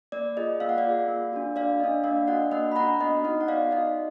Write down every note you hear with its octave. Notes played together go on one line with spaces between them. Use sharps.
A#3 D5
F4 G#4 D#5
A#3 F5
F#5
D5 F5
F4 G#4
A#3
D4 F#4
A#3 D5 F5
D4 F#4 D#5
A#3 D5 F5
D4 F#4 D#5 F#5
A#3 D#5 F#5
B5
D4 F#4 F#5 A#5
B3 D#5
D#4 F#4 D#5
F#5
B3 D5 F5
D#4 F#4 D#5